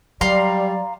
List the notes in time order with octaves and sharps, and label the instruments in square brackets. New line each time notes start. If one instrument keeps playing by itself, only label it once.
[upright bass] F#3 [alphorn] G3 [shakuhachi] D5 [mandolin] F5 A#5 C6